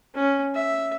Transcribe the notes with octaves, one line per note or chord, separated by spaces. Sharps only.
C#4
E5